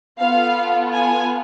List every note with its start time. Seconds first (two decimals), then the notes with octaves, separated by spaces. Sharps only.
0.19 B3 F4 A4 F5
0.94 G#5